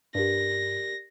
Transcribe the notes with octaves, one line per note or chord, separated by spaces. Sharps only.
G2 G4 A#4 D5 A#6